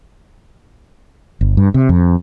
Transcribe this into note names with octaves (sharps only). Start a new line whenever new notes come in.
G1
G2
C3
F2